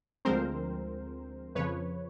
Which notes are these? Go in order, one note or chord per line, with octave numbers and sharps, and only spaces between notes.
D2 D3 F3 G#3 C4 A#4 C5
F2 C#3 F3 B4 C#5